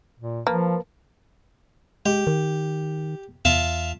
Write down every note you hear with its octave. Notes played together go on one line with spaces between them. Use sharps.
A#2
F3 A#3 A#4 B4 A5
G#3 G4
D#3
E2 F4 E5 A5